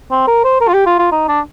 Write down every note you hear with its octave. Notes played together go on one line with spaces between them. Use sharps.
C4
A#4
C5
A#4
F4
G4
F4
F4
D#4
D4